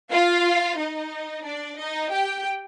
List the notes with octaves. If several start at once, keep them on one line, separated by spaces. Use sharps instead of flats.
F4 F5
D#4 D#5
D4 D5
D#4 D#5
G4 G5